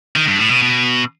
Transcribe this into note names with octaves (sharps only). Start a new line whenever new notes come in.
D#3
G2
A2
B2
B2